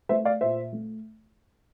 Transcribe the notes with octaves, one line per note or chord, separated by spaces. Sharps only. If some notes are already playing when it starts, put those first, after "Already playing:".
A3 C5 E5
D5 F5
A#2 C5 E5
A3